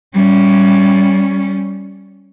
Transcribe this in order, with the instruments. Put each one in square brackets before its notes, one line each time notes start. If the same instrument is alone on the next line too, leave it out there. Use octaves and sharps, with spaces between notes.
[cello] G3 C#4